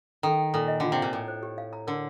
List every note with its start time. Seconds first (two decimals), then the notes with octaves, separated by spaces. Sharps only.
0.23 D#3 A4
0.39 G5
0.54 A#2 A4
0.68 D#5
0.80 D3 F4
0.92 C3
0.98 A#2 F5
1.13 A2 A#5
1.28 C5
1.43 G4
1.58 F5
1.73 A#5
1.87 D3 A#4